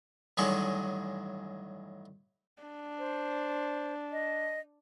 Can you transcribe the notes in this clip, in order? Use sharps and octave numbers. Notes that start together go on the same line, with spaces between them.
A1 G2 D#3 F#3 G#3 C#6
D4
C5
D#5